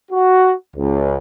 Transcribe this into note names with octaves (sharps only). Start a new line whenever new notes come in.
F#4
C#2